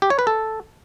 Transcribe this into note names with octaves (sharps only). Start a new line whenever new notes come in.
G4
C#5
B4
A4